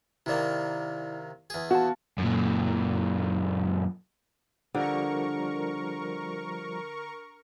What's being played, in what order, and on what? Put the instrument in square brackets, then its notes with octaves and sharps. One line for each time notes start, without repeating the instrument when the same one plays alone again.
[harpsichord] C3 D#3 A#3 [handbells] E4 D5
[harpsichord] E2 G#4
[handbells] B3 F5 A5 [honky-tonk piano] F#4
[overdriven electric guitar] F#2 A#2
[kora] D3 [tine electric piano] F3 G3 [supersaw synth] A#4 C#6